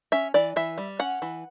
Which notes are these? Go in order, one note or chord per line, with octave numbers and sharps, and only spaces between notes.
C#4 E5
E3 D5
E3 E5
G3
C#4 F#5
E3